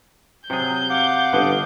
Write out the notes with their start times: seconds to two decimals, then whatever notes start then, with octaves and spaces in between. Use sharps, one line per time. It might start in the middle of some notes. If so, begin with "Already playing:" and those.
0.50 C3 F#3 G#4 G6
0.90 F5 F#5 D6
1.33 G1 D3 B3